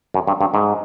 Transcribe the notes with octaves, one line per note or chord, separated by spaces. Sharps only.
F#2
G2
G2
G#2